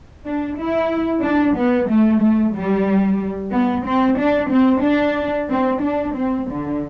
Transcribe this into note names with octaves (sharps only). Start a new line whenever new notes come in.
D4
E4
D4
B3
A3
A3
G3
B3
C4
D4
C4
D4
C4
D4
C4
D3